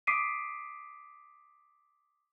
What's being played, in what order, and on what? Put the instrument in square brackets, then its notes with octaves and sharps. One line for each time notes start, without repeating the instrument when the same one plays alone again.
[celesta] D6 D#6 B6 C7 D7 D#7